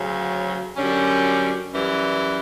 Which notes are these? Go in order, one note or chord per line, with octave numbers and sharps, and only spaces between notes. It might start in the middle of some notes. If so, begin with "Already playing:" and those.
Already playing: D2 C#3 F#3
F#2 D3 G3 C#4
F#2 E3 G3